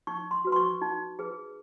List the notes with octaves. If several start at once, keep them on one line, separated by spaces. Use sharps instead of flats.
D#4 C#6
C6
F#4 B4
C6
C#6
D#4
G#4 B4